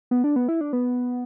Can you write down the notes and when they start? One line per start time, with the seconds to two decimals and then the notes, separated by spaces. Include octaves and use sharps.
0.11 B3
0.24 D4
0.36 B3
0.48 E4
0.61 D4
0.73 B3